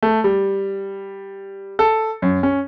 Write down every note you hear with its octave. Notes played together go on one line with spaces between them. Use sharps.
A3
G3
A4
F#2
C#4